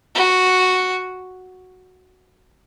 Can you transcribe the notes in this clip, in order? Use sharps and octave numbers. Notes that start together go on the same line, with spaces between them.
F#4